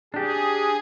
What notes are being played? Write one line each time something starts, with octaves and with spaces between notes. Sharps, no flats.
D4 G4 G#4